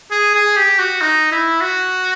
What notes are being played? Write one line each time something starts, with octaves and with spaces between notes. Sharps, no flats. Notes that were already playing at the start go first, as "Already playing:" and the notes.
G#4
G#4
G4
F#4
D#4
E4
F#4